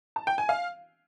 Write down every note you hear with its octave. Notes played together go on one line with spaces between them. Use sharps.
A5
G5
G#5
F5